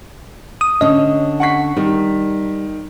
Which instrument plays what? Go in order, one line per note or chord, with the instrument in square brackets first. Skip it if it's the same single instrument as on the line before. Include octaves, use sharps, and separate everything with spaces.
[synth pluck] D#6
[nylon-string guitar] D3 C#4 [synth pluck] D#5
[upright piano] F#5 C#6 B6
[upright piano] D#3 [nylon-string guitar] G3